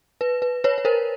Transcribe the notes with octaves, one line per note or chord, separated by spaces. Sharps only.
B4
B4
B4 C#5
B4
A#4 C5